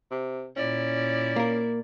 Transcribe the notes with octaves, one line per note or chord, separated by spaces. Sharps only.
C3
A#2 C#4 E4 D5
A#3 A#4